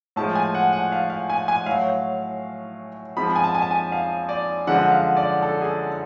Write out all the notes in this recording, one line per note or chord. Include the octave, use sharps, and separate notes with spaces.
A2 F3 G#3 A5
G#5
F#5
F#5
F5
F5
G#5
G#5
A2 F#3 F5
F2 F3 G#3 B5
A5
G#5
A5
G#5
A5
G#5
F5
D5
F#2 D3 F3 G#3 F#5
F5
D5
A4
G#4